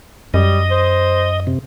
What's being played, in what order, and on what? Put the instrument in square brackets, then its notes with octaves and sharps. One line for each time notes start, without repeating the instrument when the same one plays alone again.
[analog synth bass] F#2 [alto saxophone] G3 [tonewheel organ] D#5
[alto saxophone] C5
[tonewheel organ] C3